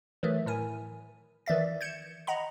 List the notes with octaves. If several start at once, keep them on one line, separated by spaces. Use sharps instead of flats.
D#3 E3 F#3 A3
A2 A#4 G#5
D#3 E3 D5 E5 A6
G6 G#6 C#7 E7
D#5 F#5 A#5 B5